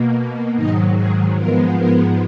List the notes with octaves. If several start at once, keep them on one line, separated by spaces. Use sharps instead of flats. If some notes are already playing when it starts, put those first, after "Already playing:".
Already playing: B2 A#3
G#2 D#3 F#3 D#4 D#5
G#4
G#2 F3 G#3 B3 A#4
A#4